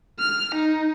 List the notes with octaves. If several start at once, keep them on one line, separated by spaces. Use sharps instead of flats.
F6
D#4